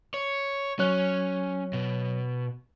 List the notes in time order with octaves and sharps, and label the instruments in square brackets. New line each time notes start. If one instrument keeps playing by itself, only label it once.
[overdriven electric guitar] C#5
[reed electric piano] F#3 C#5 F#6 [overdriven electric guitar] C#4
[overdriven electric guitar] B2